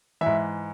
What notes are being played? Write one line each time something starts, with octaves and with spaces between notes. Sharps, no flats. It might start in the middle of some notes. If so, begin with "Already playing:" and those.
G#2 E3 E5